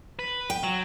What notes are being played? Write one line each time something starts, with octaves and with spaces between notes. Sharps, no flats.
B4
G5
F#3